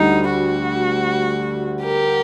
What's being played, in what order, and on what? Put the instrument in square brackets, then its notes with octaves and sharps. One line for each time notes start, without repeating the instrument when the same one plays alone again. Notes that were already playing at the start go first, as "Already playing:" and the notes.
Already playing: [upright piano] D2 D3 G3 [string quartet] D#4
[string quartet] F#4
G4 A#4